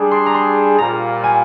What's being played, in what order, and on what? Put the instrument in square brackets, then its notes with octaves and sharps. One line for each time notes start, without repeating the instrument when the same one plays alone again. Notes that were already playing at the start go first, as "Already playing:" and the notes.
Already playing: [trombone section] G3 D4 G#4
[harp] C6
A#5
C6
[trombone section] A#2 G3 A#3 F4 C5 [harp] A#5
[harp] G#5